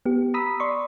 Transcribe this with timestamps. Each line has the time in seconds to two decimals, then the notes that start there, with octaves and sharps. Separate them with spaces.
0.06 B3 G4
0.34 A#5 B5 D#6 E6 B6
0.60 D5 C6 C#6